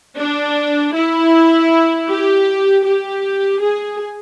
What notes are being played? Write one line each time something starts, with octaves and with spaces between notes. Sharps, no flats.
D4
E4
G4
G4
G#4